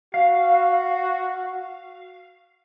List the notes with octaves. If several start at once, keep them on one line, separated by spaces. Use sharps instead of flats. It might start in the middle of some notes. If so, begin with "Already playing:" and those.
F#4 F5